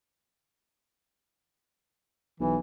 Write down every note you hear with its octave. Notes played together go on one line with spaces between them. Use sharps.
B1 E3